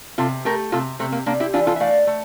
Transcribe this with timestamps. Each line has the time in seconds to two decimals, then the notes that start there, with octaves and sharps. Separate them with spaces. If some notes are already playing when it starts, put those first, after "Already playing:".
0.18 C3 F4 A4
0.45 A3 G4 A#4
0.72 C3 F4 A4
0.99 C3 A3 C4
1.12 A#3
1.26 C3 A#3 D4
1.40 E4 G4
1.53 E3 D4 F4
1.67 F4 A4
1.76 E5
1.80 A3 D5 F5
2.07 A3